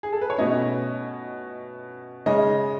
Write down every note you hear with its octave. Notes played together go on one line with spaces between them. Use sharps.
G#4
A4
B4
C#5
B2 A3 C#4 D#5
C#3 G#3 C#4 D#5